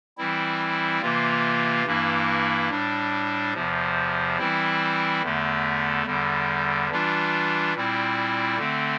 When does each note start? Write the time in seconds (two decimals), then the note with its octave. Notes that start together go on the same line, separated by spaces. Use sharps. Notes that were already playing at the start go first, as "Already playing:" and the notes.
0.18 E3 G3 C4 E4
1.02 C3 E3 A#3 F4
1.86 G2 E3 A#3 E4
2.70 A2 G3 D4
3.54 E2 C3 F3
4.38 E3 G3 C4 E4
5.22 E2 D3 A3
6.06 E2 D3 G3
6.90 E3 G3 D4 F4
7.74 A#2 G3 C4 E4
8.58 D3 A3 C4